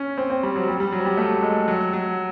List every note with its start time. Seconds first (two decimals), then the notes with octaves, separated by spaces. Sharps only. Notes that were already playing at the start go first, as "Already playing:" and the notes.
Already playing: C#4
0.18 C4
0.30 C4
0.43 G3
0.56 F#3
0.68 G3
0.80 G3
0.92 F#3
1.05 G3
1.17 A3
1.42 G#3
1.68 F#3
1.93 F#3